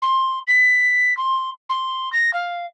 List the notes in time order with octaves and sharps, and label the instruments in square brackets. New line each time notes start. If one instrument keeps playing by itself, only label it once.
[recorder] C6
B6
C6
C6
A#6
F5